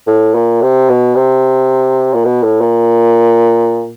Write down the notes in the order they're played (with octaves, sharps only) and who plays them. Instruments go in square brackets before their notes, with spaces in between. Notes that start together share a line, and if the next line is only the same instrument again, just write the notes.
[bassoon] A2
A#2
C3
B2
C3
A#2
B2
A2
A#2